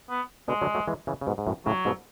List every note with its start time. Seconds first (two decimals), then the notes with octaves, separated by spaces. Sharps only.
0.09 B3
0.48 B2 D3 G#3
0.62 D3 F#3
0.75 F#3 A3
0.88 E3 G#3
1.07 C#3 E3
1.21 C#3
1.27 G#2 B2
1.38 G#2
1.47 F#2 A2
1.66 A2 C#3 F#3
1.85 G#2 B2